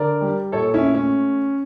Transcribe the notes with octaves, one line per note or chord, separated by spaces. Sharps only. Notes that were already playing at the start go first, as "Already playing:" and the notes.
Already playing: D3 A#4 D5
G3
A#2 A4 C#5
C#4 E4
A3
C#4